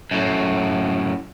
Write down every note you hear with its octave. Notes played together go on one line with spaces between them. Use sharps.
F#2 A2